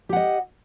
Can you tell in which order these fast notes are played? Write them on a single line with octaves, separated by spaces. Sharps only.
G4 F#5 D#5